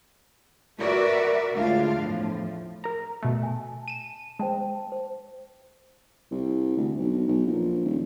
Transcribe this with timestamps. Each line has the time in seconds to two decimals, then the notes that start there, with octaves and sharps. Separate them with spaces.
0.79 F#4 A#4 B4 D5 E5
1.53 D2 A2 G#3 D4 F4 F5
1.97 E2 A2 F3
2.84 A#4 A#5
3.23 B2 A3
3.43 G#5 A5
3.88 D#7 E7
4.39 G#3 C5 G5 A5
4.92 C5
6.31 C2
6.77 D2
6.98 B1
7.27 B1
7.47 A#1
7.85 D#1